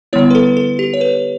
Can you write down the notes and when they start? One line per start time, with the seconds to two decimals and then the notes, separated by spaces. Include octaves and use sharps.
0.13 D3 G3 B3 E4 C#5
0.30 B4
0.35 A4
0.57 A4
0.79 G4
0.94 C#5
1.01 B4